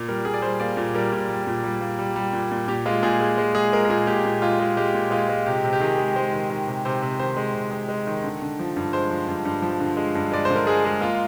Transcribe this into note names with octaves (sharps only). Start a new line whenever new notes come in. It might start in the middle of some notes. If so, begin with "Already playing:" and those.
Already playing: A#2
G3 A#4
A#2 G#4
D5
G3 C5
A#3 D5
A#2
G3 A#4
A#2
G3
A#2
G3
A#3
G3
G3
A#2
A#2
A#2 G4
G#3 F4
A#2 G#4
G#3
G#3
G#3 G#4
G#3 A#4
A#4
A#2 G#4
A#2 G4
A#2
G#3 F4
G#3
G#3 G4
A#2
G#3 F4
G#3
C3 G4
C3
G4
D#3 G#4
G#3
G#3 C5
D#3
D#3
C3
C3 C5
C3
D#3 C5
G#3
C3
G#3
G#3
D#3
D3
D3
F3
G2
G#3 C5
F3
G2
G2
F3
D3
G#3
G2
G#3 D5
C5
D3
A#4
G#3 G#4
G#3
A#3 F4